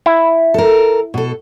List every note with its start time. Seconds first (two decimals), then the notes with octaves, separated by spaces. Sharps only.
0.06 E4
0.54 A4 A#4
1.14 B2 A4